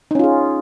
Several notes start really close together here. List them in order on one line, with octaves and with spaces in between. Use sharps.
D#4 C#4 F4 G#4